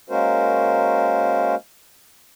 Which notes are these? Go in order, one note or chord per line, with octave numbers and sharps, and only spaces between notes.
G#3 A#3 C#4 F#4 A#4 C5